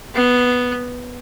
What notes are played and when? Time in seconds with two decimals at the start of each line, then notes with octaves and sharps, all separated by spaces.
0.14 B3